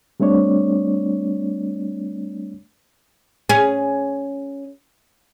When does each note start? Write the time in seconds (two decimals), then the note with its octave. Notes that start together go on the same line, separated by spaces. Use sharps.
0.20 G3 A3 C4 D4 C#5 D5
3.49 C#4 G#4